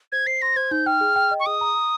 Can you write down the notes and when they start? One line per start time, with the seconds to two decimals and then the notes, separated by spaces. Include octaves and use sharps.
0.12 C5 G#6
0.27 C5 C7
0.42 C6 A#6
0.56 C5 G#6
0.71 D#4 G6
0.86 G5 F6
1.01 G#4
1.16 G5
1.31 D#5
1.40 C#6
1.46 G#4 D#6
1.61 A#5
1.75 A#5